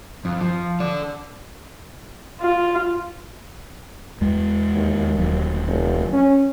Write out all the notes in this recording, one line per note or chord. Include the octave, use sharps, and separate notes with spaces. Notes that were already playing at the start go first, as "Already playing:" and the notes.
F2
F3
A4 D5
F4
E2 G#3
D#2
D#1 F#3
F1
C#4